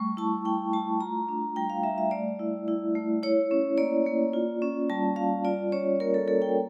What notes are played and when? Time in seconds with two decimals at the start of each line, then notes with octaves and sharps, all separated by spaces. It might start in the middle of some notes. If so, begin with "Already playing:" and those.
Already playing: G3 A3 C#6
0.17 E4 A5
0.45 E4 G5
0.73 A3 A5
1.00 F4 A#5
1.28 D4
1.56 G3 G5
1.70 F5
1.83 G3 E5
1.98 E5
2.11 A3 D5
2.39 E4
2.68 E4
2.95 A3
3.23 E4 C#5
3.51 C#4
3.78 A#3 D5
4.06 A#3
4.33 F4
4.62 C#4
4.89 G3 A5
5.16 G3 F5
5.45 F4 D5
5.72 C#4 C#5
6.00 A#3 A#4
6.14 A4
6.28 A#3 A4
6.42 G5